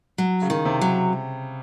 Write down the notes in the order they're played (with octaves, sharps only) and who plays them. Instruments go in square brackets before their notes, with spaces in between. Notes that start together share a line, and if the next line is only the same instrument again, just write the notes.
[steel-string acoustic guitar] F#3
[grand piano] C#3
[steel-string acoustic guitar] D#3
[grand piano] C3
[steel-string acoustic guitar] F#3